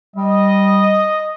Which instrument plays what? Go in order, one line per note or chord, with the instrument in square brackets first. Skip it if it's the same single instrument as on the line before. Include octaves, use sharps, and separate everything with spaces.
[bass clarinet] G3 [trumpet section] D#5